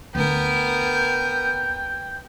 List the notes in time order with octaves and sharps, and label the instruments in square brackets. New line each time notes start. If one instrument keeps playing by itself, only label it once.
[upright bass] D2 D4 [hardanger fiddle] B3 A#4 [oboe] G5